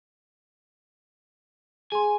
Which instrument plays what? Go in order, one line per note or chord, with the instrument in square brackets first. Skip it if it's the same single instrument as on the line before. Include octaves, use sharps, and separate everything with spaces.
[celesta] G#4 C6 [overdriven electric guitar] G#5